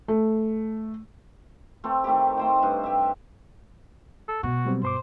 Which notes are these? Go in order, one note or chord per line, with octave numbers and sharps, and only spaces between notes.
A3
A3 C4
D#3 A3 E4 G4
A3 C5 G5
G2
G4 E5
A4
B2 F#4
F#3 G3 C4
G2 C5 C6 D6